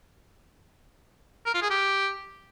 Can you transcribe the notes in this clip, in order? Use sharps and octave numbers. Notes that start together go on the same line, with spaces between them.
A#4
F4
G#4
G4